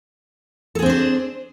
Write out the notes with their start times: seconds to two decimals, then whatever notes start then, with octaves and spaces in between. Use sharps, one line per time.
0.75 A4
0.79 G#4
0.82 C4
0.86 D4
0.90 C5